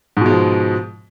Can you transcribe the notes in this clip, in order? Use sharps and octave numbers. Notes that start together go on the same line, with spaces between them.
G#2 B2 F3 G#3